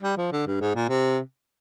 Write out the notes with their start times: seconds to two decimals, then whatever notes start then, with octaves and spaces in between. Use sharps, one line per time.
0.03 G3
0.17 F3
0.32 D3
0.47 G2
0.61 G#2
0.75 A#2
0.89 C3